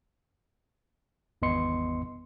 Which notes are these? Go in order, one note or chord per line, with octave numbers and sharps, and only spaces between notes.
G#1 E2 B3 D#5 C6 C#7